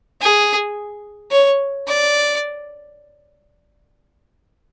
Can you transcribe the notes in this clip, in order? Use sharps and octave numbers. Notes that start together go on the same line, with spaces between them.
G#4
C#5
D5